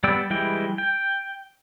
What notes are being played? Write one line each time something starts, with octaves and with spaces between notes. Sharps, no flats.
G3 B3 D5 G5 E6
E3 G3 G#3 E4 G5
G5